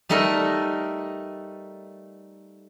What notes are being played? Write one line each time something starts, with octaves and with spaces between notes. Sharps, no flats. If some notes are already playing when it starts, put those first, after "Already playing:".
G3 A3 D#4 A4 A#4